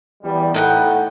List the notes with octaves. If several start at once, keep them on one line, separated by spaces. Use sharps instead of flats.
E2 G3
A2 D#4 F#5 G5